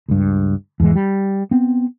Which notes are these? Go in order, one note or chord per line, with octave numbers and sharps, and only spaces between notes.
C#2 G2
E2 G#2 E3 G#3
G3
B3 C4